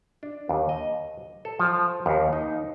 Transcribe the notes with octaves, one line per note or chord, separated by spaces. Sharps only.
D4
D#2
D#5
A4
F3
D#2
D#4